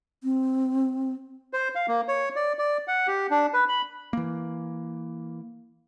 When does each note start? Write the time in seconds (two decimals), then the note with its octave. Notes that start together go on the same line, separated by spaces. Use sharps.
0.24 C4
1.53 C5
1.75 F5
1.88 A#3
2.08 C#5
2.36 D5
2.59 D5
2.88 F#5
3.07 G4
3.31 D4
3.54 B4
3.69 B5
4.13 E3 A#3